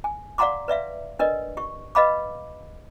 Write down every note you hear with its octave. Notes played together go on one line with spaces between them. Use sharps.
G#5
D5 F5 F#5 A#5 C6 D6
B4 D5 E5 F5
D4 A#4 B4 D5 D#5
G4 C#6
B4 D#5 F5 B5 D6